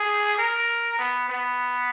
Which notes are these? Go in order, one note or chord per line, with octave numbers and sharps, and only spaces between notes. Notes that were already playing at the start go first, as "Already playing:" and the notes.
Already playing: G#4
A#4
B3
B3